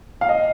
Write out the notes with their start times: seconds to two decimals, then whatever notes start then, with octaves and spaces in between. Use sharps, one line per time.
0.21 F5
0.29 D#5